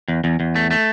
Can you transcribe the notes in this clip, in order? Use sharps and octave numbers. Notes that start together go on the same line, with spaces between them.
E2
E2
E2
A3
A3